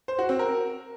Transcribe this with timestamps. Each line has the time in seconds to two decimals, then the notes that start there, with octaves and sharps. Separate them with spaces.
0.08 C5
0.19 F#4
0.29 C4
0.39 A#4